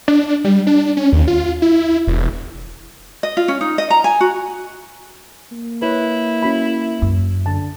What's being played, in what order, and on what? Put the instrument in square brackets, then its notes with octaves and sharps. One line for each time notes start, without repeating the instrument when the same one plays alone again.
[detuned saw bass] D4
G3
D4
C#4
D#2
F4
E4
E1
[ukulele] D#5
F4
C#4
D#4
D#5
A#5
G#5
F#4
[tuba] A#3
[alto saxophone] E4 [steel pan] B4 C#5
[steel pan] C#4 F#4 B5
[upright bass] F#2
[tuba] D3 [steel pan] A5